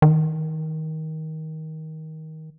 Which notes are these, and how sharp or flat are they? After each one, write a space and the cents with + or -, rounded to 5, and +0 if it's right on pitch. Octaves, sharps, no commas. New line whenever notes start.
D#3 +20